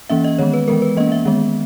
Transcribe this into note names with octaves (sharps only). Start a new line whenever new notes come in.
E3 A#3 C#4 E5
D#5
D#3 G#3 B3 C#5
B4
E3 G#3 B3 A#4
B4
E3 A#3 C#4 D#5
E5
D#3 G#3 B3